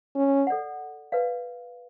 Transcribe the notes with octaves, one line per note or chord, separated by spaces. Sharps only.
C#4
A4 D5 F#5
B4 D5 F5